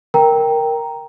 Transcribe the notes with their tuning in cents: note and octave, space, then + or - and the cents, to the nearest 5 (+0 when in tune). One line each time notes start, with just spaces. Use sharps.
A#4 +0 G5 +0 A#5 +0